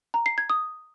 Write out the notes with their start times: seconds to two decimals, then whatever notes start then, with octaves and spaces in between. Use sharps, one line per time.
0.14 A#5
0.26 C7
0.38 G#6
0.50 D#6